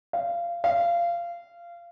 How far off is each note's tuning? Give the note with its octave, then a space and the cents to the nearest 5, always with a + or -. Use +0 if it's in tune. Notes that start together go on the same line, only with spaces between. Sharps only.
F5 -20
F5 -20